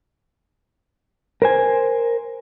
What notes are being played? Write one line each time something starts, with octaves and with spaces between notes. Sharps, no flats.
A#4 C5 G#5